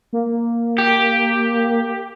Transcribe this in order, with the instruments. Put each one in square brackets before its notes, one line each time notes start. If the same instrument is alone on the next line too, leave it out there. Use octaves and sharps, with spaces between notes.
[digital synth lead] A#3
[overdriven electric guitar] G4